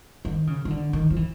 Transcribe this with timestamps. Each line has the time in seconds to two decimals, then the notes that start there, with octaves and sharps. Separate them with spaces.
0.25 D#3
0.47 C#3
0.65 D#3
0.70 D3
0.93 D#3
1.10 F3
1.16 E3